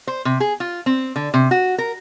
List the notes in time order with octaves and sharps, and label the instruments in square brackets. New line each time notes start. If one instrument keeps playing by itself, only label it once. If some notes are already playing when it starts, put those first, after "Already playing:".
[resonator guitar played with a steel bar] C5
C3
G#4
F4
C4
D3
C3
F#4
A#4